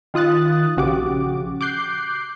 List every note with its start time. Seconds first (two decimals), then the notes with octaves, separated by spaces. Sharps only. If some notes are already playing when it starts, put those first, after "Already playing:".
0.14 D#3 F4 D#6 F#6 A6
0.77 A#1 C#3 F#4 G4 D6
1.61 D6 F#6 G6 C7